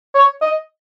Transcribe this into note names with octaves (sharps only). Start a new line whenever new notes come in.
C#5
D#5